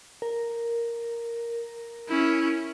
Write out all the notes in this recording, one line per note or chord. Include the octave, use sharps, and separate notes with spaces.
A#4
C#4 E4